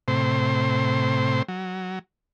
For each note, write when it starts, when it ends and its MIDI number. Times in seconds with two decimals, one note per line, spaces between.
0.08 1.42 45
0.08 1.42 48
0.08 1.42 72
1.48 1.99 54